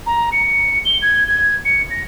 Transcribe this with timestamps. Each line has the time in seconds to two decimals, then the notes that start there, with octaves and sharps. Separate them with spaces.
0.06 A#5
0.32 C#7
0.85 G7
1.02 G#6
1.28 G#6
1.65 C#7
1.90 A#6